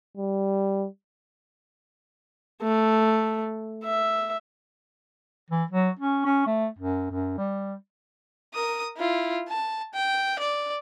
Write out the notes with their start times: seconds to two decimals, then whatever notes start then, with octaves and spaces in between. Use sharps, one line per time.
0.17 G3
2.61 A3
3.84 E5
5.51 E3
5.71 F#3
5.99 C#4
6.25 C#4
6.46 A3
6.79 F#2
7.11 F#2
7.38 G3
8.54 A#4 D#6
8.97 E4 F4
9.49 A5
9.94 G5
10.39 D5